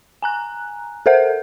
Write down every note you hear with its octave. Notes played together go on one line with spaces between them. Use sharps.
G#5 A#5 F#6
A4 A#4 C5 E5 F#5 G6